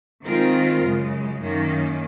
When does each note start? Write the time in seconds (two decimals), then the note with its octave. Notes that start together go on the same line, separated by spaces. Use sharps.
0.24 D#3 G#3 C4 F4 A#4
0.82 F#2 C#3 G#3
1.39 F#2 D#3 A#3 C#4